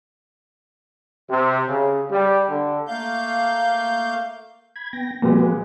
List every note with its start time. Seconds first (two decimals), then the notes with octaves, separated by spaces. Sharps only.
1.29 C3
1.68 C#3
2.10 G3
2.49 D3
2.87 A3 A#3 F5 G6
4.76 B5 G#6
4.93 B3 G5 A#6
5.22 A#2 F3 G3 G#3 F#4 B4
5.39 G#3